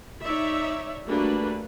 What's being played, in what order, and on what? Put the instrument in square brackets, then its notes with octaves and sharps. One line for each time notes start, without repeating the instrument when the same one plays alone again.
[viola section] D#4 C#5 D5 E5
G3 A3 A#3 D4 F#4 B4